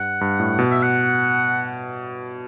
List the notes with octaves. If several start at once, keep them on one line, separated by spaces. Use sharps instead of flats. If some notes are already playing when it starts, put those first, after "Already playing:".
Already playing: G2 F#5
G2
A2
B2
E5
F#5